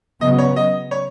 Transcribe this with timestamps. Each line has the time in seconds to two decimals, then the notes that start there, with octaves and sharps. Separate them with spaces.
0.21 C#3 F#3 B3 D#5
0.38 C#5
0.56 D#5
0.91 C#5